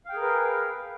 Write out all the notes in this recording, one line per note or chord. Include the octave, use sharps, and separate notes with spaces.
G#4 A#4 B4 F5 G5